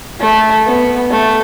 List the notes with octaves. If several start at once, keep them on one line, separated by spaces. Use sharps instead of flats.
A3
B3
A3